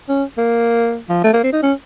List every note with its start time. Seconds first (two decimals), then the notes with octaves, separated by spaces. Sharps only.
0.09 C#4
0.38 A#3
1.09 F3
1.24 A3
1.33 A#3
1.44 C4
1.53 D#4
1.63 C#4